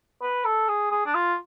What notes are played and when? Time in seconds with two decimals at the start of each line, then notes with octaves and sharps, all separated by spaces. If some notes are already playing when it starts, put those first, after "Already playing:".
0.22 B4
0.45 A4
0.69 G#4
0.91 G#4
1.06 D4
1.15 F4